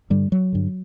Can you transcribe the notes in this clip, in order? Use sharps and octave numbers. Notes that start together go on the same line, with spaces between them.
G2 D3 G3
F#3
G2 D3